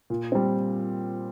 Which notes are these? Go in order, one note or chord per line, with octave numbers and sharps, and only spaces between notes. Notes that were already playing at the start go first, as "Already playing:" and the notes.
A#2
G3 C4